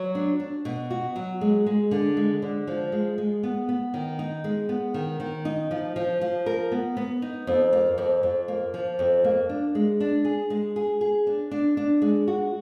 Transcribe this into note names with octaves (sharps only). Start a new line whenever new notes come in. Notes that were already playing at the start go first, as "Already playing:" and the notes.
Already playing: F#3
D4
D4
B2
F#4
F#3
G#3
G#3
D3
G#3
D3
F3
G#3
G#3
B3
B3
D#3
D#4
G#3
B3
D#3
D#3
D#4
F3
F3
F3
A#4
B3
B3
D#4
F2
A#3
F2
F2
A#3
F3
F2
A#3
D4
G#3
D4
G#4
G#3
G#4
G#4
D4
D4
D4
G#3
F#4